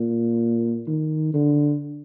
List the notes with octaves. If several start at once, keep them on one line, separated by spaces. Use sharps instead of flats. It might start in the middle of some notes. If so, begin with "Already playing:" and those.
Already playing: A#2
D#3
D3